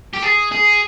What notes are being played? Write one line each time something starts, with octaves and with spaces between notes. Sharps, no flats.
G4
G#4
G#4